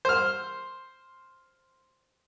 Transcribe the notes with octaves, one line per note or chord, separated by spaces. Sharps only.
C5 F6